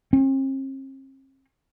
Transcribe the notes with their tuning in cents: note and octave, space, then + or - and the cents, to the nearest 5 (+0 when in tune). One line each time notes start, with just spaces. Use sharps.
C4 +45